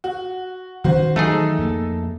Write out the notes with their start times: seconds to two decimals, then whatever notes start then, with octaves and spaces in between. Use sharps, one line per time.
0.04 F#4
0.84 D#3 C4 C#4 F#4 C5
1.16 D#3 E3 F#3 A3 D#4 G#4 A4
1.58 F2 A#3